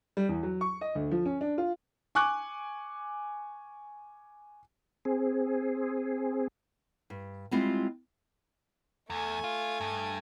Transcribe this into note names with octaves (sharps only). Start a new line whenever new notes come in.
G3
E2
F#3
C#6
D#5
D2
F3
C#4
D4
F4
G#5 C#6 D6 F#6
C4 G#4
G2
G3 G#3 C4 E4 F4
E2 A3 G#5
F4
G2